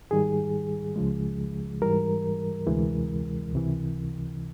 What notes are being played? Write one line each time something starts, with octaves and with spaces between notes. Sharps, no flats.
G#2 D#3 G3 G#4
C#2 C#3 F3 G#3
G#2 E3 G3 A#4
D2 C3 E3 G#3
C#2 C3 E3